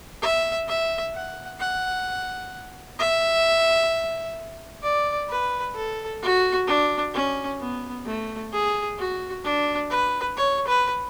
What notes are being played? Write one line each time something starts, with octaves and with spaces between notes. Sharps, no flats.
E5
E5
F#5
F#5
E5
D5
B4
A4
F#4
D4
C#4
B3
A3
G#4
F#4
D4
B4
C#5
B4